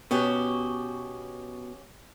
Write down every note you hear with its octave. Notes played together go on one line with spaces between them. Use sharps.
B2 C#4 F#4 G4